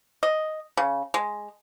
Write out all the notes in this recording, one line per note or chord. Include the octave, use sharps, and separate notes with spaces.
D#5
C#3
G#3